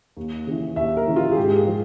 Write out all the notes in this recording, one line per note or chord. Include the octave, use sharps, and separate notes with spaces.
D#2
C#3 E3
D#2 E5
A#4
C#3 E3
F4
G#4
G#2 G4
G#4
F3